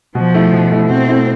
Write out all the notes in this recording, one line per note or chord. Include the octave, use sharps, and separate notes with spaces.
B2 F3
A3 E4
B2
A3 E4
B2 C4
A3 E4